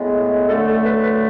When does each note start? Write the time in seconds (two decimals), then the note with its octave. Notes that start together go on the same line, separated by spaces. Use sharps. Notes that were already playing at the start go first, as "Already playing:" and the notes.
Already playing: A2 G#3 B3
0.48 F#2 D3 A3 A4
0.66 A4
0.85 B4
1.03 B4